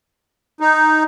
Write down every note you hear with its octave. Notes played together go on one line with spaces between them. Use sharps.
D#4